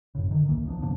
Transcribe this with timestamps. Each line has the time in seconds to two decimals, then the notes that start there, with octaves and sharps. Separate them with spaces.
0.15 G1 F#2 A2 C#3
0.31 D3 D#3
0.47 D1 A#1 E3 A#3
0.65 D#1 F3 B3 D4
0.82 G2 C3 A#3 D4